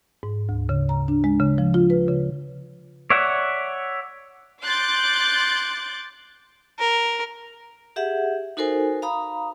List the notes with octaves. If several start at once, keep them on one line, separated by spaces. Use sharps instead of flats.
G#2
D2
C#3
A#5
D4
G#3
C#3
F3
F4
B4
C#3
C#5 D5 E5 F#5
C6 D6 F#6 G6 A6
A#4
G4 G#4 E5 F#5
D#4 F#4 A4 A#4 C5 G#5
F5 A#5 B5 D#6